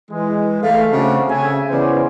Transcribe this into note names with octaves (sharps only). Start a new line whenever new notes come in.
E3 G#3
A3 F5
C#3 A3 C4 D4 F#4
C#3 E5 G#5
C#3 E3 B3 C#4 C5 D5